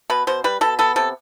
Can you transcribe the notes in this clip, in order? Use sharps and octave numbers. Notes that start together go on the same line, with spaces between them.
B2 B4
B2 C5
G3 B4
B2 A4
B3 A4
C3 A4